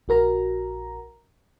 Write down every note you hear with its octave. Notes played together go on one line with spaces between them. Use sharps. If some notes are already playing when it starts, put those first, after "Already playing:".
A#1 F#4 A#4 A#5